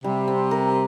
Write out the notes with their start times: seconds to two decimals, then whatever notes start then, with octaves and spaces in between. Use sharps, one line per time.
0.04 C3 G3
0.28 C4
0.51 A#4